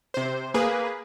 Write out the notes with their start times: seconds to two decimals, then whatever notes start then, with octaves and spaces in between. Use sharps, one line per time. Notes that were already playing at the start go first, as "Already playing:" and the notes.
0.14 C3 C5
0.54 A#3 G#4 B4